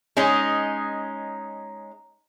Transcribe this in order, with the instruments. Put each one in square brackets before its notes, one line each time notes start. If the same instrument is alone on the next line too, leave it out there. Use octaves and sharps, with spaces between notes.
[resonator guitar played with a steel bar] G#3 C#4 D#4